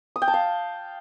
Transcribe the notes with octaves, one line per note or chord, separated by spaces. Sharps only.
D#6
G5
A5
F5